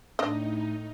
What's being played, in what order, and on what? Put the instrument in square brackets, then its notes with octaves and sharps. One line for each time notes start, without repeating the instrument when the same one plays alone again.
[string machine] A2 D#4 [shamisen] D4 D#5